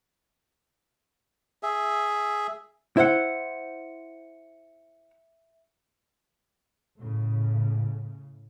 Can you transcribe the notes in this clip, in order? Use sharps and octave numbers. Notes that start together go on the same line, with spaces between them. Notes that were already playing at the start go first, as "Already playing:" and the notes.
G#4 E5
E4 C5 E5 F#5 C#7
A2 C#3